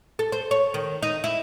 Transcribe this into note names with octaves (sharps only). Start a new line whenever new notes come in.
A4
C5
C#5
D#3
D#4
E4